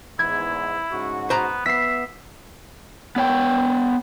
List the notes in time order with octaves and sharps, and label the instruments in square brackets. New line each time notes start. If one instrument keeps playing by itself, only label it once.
[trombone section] E2 G#2 [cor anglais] E4 [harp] G#6
[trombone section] G#2 C#3 F#4
[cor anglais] B3 [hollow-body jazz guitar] C5 A#5
[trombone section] B3 [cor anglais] E5 [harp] B6 C7
[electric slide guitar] B3 C#5 G5